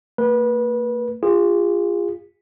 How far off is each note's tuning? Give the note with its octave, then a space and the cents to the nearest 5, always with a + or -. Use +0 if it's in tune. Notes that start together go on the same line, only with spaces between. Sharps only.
A#3 -45 B4 -25
F4 -5 G#4 -35